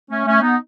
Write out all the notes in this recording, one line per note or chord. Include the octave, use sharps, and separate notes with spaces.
A3 C#4
A3 C#4
B3 D#4